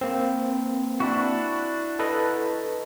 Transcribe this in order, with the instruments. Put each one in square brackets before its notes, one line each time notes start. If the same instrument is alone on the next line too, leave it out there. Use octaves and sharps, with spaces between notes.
[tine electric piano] A#3 C4
[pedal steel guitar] D4 E4 F#4
[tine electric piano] A4 B4 D#5